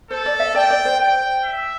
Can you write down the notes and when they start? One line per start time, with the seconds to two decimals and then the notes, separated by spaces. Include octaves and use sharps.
0.10 A4 C5
0.26 D5
0.40 E5
0.55 D5 G5
0.70 D5
0.85 C5
0.99 G5
1.45 E5